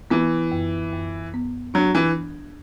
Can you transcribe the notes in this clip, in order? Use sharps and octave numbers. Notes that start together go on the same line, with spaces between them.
E3 B3
F#2
F#2
B3
F#3 D4
E3